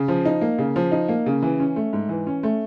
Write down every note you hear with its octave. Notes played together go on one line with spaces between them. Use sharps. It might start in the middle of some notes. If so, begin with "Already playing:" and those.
Already playing: C#3
F3
D#4
A#3
C#3
F3
D#4
A#3
C#3
E3
C#4
A3
G#2
E3
C#4
A3